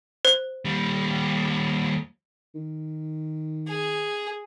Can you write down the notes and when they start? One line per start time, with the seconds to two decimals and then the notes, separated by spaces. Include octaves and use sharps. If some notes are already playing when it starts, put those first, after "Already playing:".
0.25 C5
0.65 D#2 G3
2.55 D#3
3.68 G#4